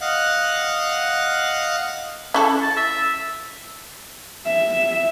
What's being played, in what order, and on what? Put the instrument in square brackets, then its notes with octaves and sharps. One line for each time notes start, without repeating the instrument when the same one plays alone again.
[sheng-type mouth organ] D#5 F5 F#5 F#6
[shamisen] C#4 E4 A4
[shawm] A5
E5
[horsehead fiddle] E5